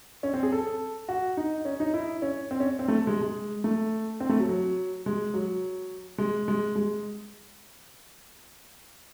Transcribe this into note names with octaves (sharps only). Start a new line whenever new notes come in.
C#4
C4
G#4
A4
F#4
D#4
C#4
D#4
E4
C#4
C4
C#4
C4
A3
G#3
G#3
A3
C4
A3
F#3
F#3
G#3
F#3
G#3
G#3
G#3